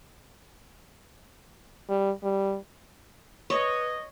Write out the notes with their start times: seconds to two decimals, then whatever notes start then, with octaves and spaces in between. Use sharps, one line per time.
1.89 G3
2.23 G3
3.50 B4 C#5 D#5